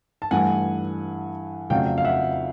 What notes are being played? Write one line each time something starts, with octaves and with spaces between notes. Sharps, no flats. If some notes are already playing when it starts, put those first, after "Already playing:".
A5
G2 E3 A3 F#5 G#5
F2 C#3 F#3 A3 F5 G5
F5
E5 F#5